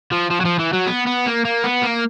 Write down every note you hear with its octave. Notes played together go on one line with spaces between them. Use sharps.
F3
F3
F#3
F3
E3
F#3
B3
B3
A#3
A#3
B3
A#3